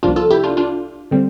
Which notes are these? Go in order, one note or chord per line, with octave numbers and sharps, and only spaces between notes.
C2 C3 F3 A#3 D4 F4
F4 A4
E4 G4
D4 F4
D4 F4
D3 G3 C4